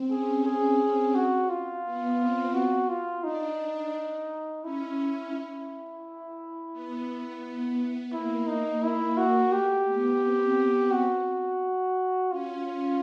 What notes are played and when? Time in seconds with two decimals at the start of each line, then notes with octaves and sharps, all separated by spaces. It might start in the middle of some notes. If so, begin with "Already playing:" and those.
Already playing: C4
0.10 C#4 G#4
0.45 C4 G#4
1.15 F#4
1.49 F4
1.85 B3
2.19 C4
2.54 F#4
2.89 F4
3.24 D4 D#4
4.64 C#4 E4
5.33 E4
6.73 B3
8.12 A#3 E4
8.47 D#4
8.82 E4
9.18 F#4
9.52 A3 G4
9.87 B3
10.21 C4
10.91 F#4
12.31 C#4 F4